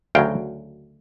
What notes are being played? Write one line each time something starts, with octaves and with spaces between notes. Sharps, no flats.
D2 C#3 F#3 F5 G5